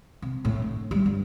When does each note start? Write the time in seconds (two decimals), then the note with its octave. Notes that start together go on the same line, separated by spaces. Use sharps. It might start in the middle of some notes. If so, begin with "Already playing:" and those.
0.22 C3
0.45 A2
0.62 D3
0.91 G3
1.06 G1